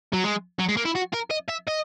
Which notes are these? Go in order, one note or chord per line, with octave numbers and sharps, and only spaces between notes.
F#3
G#3
F#3
G#3
A#3
E4
F#4
A#4
D#5
E5
D#5